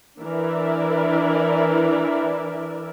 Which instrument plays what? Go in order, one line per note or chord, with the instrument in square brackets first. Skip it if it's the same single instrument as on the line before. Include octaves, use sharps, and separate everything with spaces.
[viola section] E3 D4 E4 A#4 D5 E5